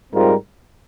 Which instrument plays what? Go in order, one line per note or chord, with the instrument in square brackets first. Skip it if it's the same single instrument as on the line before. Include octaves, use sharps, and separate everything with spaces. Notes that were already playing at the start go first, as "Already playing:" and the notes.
[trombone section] G#2 G3 C4 F4 A#4